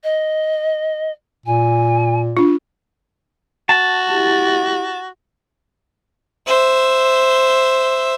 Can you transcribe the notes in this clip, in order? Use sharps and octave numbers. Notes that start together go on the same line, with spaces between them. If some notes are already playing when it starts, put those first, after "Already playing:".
D#5
A#2 G#5
D4 F4
F#4 A5
E4 G4
C5 E5